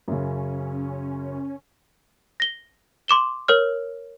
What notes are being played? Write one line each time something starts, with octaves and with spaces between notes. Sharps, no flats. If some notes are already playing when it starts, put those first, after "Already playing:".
F#2 C#3 C#4
A#6 G7
C6 D6 E7 G7
A#4 C#5 F6